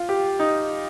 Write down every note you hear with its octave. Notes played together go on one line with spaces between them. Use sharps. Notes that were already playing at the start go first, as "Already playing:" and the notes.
Already playing: F4
G4
D#4